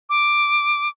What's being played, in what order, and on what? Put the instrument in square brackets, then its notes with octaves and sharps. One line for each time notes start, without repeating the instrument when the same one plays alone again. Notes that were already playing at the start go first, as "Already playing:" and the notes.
[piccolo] D6